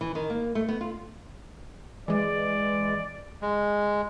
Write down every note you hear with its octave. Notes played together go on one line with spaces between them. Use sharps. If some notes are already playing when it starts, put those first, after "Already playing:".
E3
D#3
A#3
A3
B3
F4
E3 G#3 D5
G#3